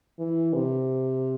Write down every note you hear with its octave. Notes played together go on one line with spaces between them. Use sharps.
E3
C3